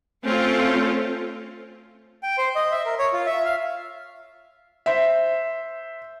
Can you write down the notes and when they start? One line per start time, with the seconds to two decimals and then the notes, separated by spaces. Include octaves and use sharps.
0.24 A3 C4 C#4 F4 A4
2.23 G5
2.38 C5
2.56 D#5
2.71 E5
2.85 A#4
2.99 C#5
3.13 F4
3.26 E5
3.45 F5
4.86 C5 E5